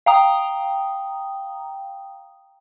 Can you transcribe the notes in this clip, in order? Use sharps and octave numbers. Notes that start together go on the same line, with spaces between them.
F5 G5 A#5 D#6